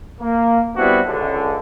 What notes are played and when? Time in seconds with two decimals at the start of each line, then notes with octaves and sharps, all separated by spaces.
0.20 A#3
0.75 G3 B3 C4 D4 E4 F#4
1.06 C#2 D3